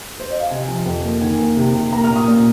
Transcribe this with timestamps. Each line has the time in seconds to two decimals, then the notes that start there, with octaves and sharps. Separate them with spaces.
0.20 C5
0.30 D#5
0.40 F5
0.50 C3 G#5
0.68 F3
0.85 F2
1.04 A#3
1.21 D#3 G#5
1.39 A#3
1.56 C3
1.74 C3
1.92 A#3 A#5
2.04 F6
2.10 A#2
2.16 D#6
2.28 A#2